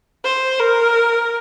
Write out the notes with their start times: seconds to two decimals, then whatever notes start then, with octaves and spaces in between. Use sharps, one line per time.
0.24 C5
0.60 A#4